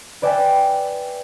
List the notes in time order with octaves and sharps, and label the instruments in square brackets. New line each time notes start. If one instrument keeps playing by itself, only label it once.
[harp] B4 D5 E5 G5 G#5